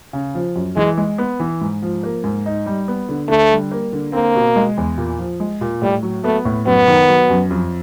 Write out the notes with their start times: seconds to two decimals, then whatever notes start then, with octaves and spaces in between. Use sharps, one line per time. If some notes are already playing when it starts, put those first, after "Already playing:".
0.13 C#3
0.35 F3
0.56 F#2
0.76 E3 G#3
0.98 G#3
1.18 B3
1.40 E3
1.61 G#2
1.82 F3
2.03 A#3
2.24 G#2
2.46 D#4
2.66 G3
2.88 B3
3.09 D3
3.29 D3 A3
3.51 G3
3.72 A#3
3.93 D3
4.13 A#3 C4
4.35 B2
4.56 G#3
4.77 E2
4.98 A#2
5.19 F3
5.40 G#3
5.61 A#2
5.82 A2 G3
6.03 F#3
6.24 A3 B3
6.45 A2
6.66 F#2 B3
6.87 D#3
7.08 F#3
7.30 F#2
7.50 F2